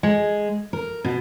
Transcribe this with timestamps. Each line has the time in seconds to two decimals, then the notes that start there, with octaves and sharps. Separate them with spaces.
0.03 G#3
0.73 A#4
1.04 B2